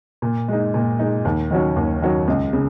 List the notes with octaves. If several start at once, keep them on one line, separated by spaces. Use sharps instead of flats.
A#2
G#3 D#4
A#2
G#3 D#4
D#2
D#3 F#3 C#4
D#2
D#3 F#3 C#4
C#2
C#3